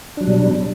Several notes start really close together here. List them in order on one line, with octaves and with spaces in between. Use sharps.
D4 F#3 G3 B2